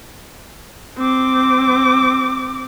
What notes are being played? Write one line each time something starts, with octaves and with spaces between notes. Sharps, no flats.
C4 D6